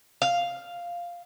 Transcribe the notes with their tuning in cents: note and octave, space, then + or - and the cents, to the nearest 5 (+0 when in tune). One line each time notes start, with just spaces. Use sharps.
F5 +0